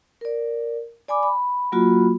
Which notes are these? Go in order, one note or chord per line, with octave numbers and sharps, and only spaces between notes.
A#4 D5
D5 G#5 B5 D6
B5
F#3 A#3 F4 F#4 B5